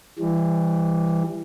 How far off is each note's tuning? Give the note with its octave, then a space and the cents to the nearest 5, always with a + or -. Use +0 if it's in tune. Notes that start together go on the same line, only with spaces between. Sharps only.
E3 +15 G3 +30